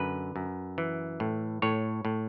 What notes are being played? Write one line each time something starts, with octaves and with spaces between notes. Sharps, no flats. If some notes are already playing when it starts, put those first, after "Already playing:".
Already playing: F#2 D3 B4
F#2
E3
A2
A2 C#5
A2